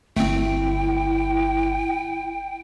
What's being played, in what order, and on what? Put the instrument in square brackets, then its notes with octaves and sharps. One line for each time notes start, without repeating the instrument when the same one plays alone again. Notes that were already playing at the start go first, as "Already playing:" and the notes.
[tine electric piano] G1 [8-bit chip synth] A3 C4 [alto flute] E4 [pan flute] G5